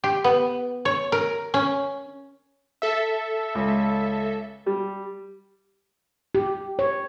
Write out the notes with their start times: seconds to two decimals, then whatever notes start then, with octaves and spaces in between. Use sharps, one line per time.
0.04 G4
0.24 B3
0.85 C#5
1.12 A#4
1.54 C#4
2.82 A4 E5
3.55 C#2
4.66 G3
6.35 G4
6.79 C#5